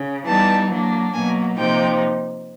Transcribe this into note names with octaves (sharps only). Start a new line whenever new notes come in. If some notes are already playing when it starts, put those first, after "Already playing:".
Already playing: C#3
E3 G3 B3 D#4 A5
F#3 A#3 D4
B2 F#3 A#3 G#5
C3 F3 A#3 D#4 G5